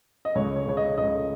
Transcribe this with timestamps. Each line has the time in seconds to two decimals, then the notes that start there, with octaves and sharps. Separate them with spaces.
0.25 D#5
0.35 C#2 C#5
0.56 C#5
0.66 C#3 C#5
0.77 D#5
0.98 C#2 D#5